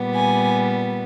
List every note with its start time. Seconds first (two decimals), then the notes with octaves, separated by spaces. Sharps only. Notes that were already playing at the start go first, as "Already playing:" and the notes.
Already playing: A#2 G3 B3
0.15 G#5